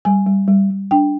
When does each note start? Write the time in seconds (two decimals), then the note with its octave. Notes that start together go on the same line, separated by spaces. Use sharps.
0.05 G3 G#5
0.26 G3
0.48 G3
0.70 G3
0.91 D4 G5